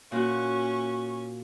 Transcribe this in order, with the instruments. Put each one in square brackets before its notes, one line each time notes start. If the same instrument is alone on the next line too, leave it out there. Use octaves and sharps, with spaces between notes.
[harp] A#2 F4 F#4 [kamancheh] C#4 C#6